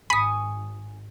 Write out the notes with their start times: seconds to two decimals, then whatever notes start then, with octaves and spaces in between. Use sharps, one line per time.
0.10 G#1 G#5 B5 C#6 D#6 B6